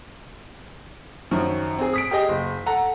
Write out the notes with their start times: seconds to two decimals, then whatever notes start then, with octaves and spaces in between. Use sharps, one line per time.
1.31 F#2 D#3 F3
1.78 C4 G#4
1.93 D#6 B6 D7
2.11 G4 G#4 D#5
2.29 F#1
2.66 A4 F#5 A#5